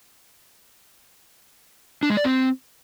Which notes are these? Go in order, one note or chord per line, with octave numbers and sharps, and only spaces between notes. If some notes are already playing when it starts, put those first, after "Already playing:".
D4
G#3
D5
C4